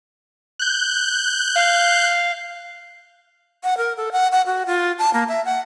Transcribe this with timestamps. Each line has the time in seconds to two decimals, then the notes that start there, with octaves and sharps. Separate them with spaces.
0.59 F#6 G6
1.55 F5
3.64 F#5
3.78 A#4
3.97 A4
4.12 F#5
4.32 F#5
4.46 F#4
4.66 F4
4.99 A5
5.14 A#3
5.28 E5
5.45 F#5